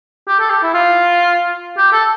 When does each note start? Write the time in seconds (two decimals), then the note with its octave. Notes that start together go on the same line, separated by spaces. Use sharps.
0.28 G4
0.40 A4
0.50 G4
0.63 E4
0.74 F4
1.78 G4
1.93 A4